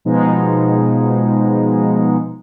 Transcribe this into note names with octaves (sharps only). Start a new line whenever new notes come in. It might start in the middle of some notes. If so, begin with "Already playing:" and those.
B2 F3 G#3 D#4